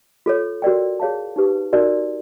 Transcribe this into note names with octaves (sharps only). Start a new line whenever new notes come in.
F4 A4 C#5
F#4 A#4 D5 G5
G#4 C#5 F5 A5
D#4 G4 B4
D#4 F#4 A#4 D5